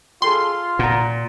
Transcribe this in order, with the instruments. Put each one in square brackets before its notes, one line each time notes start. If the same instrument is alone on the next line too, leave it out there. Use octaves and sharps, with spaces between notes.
[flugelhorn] F4 [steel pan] G#4 A4 G5 [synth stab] C6
[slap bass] A#2 [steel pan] F#5 A#5